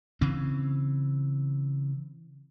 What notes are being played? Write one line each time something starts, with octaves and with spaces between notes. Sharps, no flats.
C#3 E3 C4